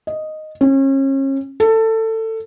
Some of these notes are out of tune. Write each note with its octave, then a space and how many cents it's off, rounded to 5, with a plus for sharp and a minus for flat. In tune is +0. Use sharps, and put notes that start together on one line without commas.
D#5 -5
C#4 -35
A4 +20